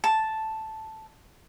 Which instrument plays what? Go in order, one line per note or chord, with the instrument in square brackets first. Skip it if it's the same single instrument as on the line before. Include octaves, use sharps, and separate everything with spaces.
[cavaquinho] A5